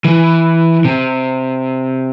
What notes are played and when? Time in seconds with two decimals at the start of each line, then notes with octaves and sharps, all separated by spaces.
0.05 E3
0.85 C3